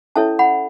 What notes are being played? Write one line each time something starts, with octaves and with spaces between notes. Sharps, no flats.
C#4 E4 A4 C#5 E5 A5
F#5 B5